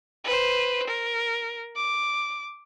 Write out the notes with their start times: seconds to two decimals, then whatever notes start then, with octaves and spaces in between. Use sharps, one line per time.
0.25 B4 C5
0.87 A#4
1.76 D6